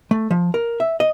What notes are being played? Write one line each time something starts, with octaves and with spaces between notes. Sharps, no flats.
A3
F3
A#4
E5
D#5